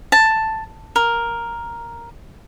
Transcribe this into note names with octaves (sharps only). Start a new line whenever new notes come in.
A5
A#4